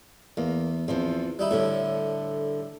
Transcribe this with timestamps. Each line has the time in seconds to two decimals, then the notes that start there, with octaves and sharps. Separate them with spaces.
0.37 E2 A#3
0.88 E2 E3 F3 C4
1.39 G3 D#4 E4
1.51 A2 D3 G3 A3 A4 C#5